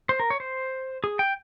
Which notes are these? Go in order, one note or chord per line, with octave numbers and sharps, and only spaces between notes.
C5
A#4
C#5
C5
G#4
G5